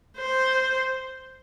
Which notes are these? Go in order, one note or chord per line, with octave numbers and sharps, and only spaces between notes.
C5